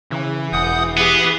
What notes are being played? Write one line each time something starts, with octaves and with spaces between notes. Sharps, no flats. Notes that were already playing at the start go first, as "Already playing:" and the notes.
C#3 E3
E1 F#5 D#6 G6
B3 G4 G#4